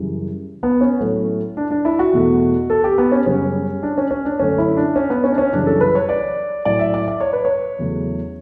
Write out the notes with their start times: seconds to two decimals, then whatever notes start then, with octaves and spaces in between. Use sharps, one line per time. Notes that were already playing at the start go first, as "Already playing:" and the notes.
Already playing: F#2 C#3 E3 G3
0.63 B3
0.81 C#4
1.00 A2 F#3 A3
1.57 D4
1.71 D4
1.85 E4
1.99 F#4
2.13 E2 B2 A3
2.70 A4
2.84 G4
2.98 B3
3.12 C#4
3.26 F#2 C#3 G3 C#4
3.83 D4
3.98 C#4
4.11 C#4
4.25 D4
4.39 F#2 D3 A3 C#4
4.58 E4
4.77 D4
4.96 C#4
5.10 B3
5.24 C#4
5.32 D4
5.38 C#4
5.53 F#2 C#3 E3 G3 D4
5.66 A4
5.81 B4
5.95 C#5
6.09 D5
6.65 A2 F#3 A3 D5
6.79 E5
6.94 D5
7.08 D5
7.20 C#5
7.33 B4
7.45 C#5
7.79 E2 C#3 F#3 A3